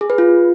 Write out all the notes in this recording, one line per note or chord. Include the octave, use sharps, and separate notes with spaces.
G#4
B4
F4